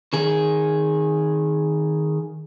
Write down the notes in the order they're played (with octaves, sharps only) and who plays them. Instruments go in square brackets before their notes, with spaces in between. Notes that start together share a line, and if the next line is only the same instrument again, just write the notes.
[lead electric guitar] D#3 G#4